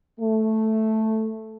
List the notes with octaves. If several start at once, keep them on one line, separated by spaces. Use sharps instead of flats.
A3